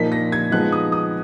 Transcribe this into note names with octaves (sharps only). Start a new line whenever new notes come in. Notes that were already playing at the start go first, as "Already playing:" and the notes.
Already playing: A#2 F3 A#3 D#4 B6
A#6
G#6
F3 G#3 B3 D#4 F#6
D#6
D#6